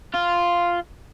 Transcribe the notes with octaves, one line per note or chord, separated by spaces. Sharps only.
F4